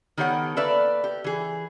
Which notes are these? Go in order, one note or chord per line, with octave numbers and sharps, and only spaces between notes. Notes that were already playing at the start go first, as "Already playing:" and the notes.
D#3 B3 G4 A4 C#5 F#5
A#3 A4 B4 D5 E5
G4
E3 G#4